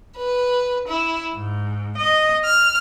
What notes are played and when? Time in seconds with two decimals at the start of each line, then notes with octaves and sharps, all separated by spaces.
0.17 B4
0.87 E4
1.35 G#2
1.96 D#5
2.43 F6